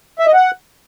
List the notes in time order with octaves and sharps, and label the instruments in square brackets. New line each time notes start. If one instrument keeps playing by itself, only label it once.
[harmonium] E5
D#5
F#5